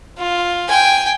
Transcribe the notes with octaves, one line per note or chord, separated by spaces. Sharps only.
F4
G5 G#5